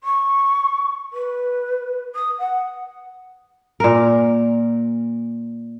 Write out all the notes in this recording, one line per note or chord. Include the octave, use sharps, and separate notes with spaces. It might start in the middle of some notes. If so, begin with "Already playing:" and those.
C#6
B4
D#6
F#5
A#2 A#4